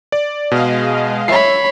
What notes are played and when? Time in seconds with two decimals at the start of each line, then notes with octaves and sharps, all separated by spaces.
0.12 D5
0.51 B2 G#3 D#5 F5
1.28 C#5 E5 B5 C7